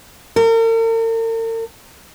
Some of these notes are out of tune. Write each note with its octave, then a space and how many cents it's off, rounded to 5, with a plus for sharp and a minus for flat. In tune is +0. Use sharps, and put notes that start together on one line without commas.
A#4 -45